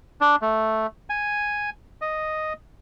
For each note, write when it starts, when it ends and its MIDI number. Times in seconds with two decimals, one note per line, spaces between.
0.21 0.36 62
0.42 0.87 57
1.10 1.70 80
2.02 2.53 75